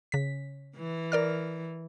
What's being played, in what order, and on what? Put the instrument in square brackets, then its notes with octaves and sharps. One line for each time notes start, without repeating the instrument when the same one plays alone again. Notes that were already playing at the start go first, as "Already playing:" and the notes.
[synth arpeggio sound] C#3 B6
[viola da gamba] E3
[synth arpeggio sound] A#4 D5 F6